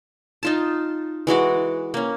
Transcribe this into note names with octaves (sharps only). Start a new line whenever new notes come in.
D#4 F4 A5
E3 G#3 F#4 D6
A#3 C#4